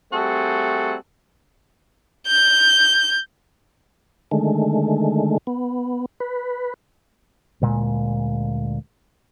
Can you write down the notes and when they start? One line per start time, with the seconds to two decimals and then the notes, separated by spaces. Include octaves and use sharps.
0.12 G3 A3 C4 F#4 G#4 A4
2.27 G6
4.31 D3 D#3 G#3 A3
5.47 B3
6.20 B4
7.61 D2 A#2 G#3